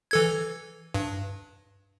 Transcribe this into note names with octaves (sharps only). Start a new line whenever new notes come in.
E3 A4 G#6
G2